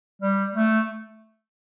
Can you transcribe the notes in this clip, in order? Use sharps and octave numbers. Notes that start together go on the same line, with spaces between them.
G3
A3